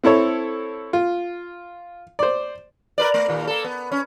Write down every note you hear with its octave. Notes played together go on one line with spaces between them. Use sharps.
C4 E4 A4 C#5
F4
C5 D5
A#4 B4 D5
A3
D#2 A#2
A#3 A4
B3
C#4